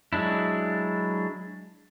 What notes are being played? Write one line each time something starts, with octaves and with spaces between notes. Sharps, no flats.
F#3 G#3 D4 E4